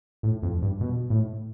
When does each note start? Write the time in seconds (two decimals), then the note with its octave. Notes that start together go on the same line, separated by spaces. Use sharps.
0.23 A2
0.43 F2
0.62 G2
0.81 B2
1.10 A2